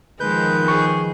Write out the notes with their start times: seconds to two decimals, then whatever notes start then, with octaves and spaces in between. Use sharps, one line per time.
0.20 D#3 F3 G#3 B4 G6
0.68 G#4 C#6